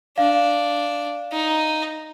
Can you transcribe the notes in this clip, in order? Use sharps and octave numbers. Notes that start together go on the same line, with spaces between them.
D4 F5
D#4